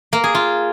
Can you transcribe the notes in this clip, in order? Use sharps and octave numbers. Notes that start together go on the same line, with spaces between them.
A#3
G#4
F4